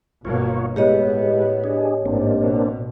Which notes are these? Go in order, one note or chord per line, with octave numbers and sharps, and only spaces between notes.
G1 B2 A#3 F4 C#5
A2 G#3 B3 G4 C#5 D#5
D4 G#4
A1 G#2 A#3 C4 D4
B2